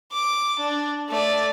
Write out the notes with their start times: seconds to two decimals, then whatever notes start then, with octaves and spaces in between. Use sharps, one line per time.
0.12 D6
0.59 D4
1.09 A3 D5